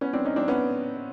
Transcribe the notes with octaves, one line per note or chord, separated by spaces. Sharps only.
B3 C#4
C4 D4
C#4 D#4
C4 D4
B3 C#4